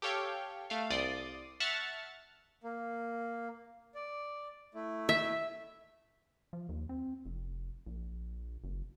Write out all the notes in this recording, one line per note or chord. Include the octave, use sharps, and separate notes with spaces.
G4 A4 C#5 F5 G5
A3 F5
C2 D5 C6 D#6
E5 F#5 A5 C#6 F6 A6
A#3
D5
A3 E4
E5
F3
D#2
C4
F1
A#1
F#1